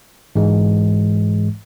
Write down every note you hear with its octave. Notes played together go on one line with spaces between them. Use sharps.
G#2 E3 G#3